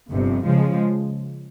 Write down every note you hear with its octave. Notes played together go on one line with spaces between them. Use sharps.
G1 F2 C3
C#3 F3 G#3